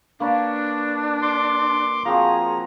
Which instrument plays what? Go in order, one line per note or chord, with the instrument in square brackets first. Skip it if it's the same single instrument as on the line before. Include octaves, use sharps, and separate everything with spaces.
[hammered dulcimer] A#3 B4 C#5 [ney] D4
[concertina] C6 D6
[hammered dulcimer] F3 C4 F#4 [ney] G#4 [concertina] A#5